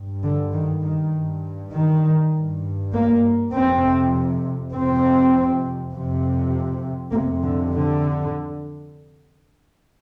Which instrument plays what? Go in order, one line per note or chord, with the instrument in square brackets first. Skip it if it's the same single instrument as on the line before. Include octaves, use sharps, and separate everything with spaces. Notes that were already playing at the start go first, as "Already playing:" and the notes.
Already playing: [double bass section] G2
D3
D#3
D#3
G2
D#3
G2
A#3
F2 C3 C4
F2 C3 C4
F2 C3
F2 C3 A#3
D3
D3